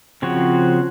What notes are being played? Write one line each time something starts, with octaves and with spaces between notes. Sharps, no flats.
C#3 F3 C4 F#4 C#5